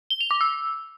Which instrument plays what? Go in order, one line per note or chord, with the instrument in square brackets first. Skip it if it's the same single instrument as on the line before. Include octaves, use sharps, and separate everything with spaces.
[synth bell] G7
F7
D6
E6